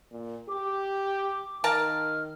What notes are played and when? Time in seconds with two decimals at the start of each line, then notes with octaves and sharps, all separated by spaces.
0.11 A#2
0.49 G4 D6
1.64 D#3 A#4 F5 A5 F6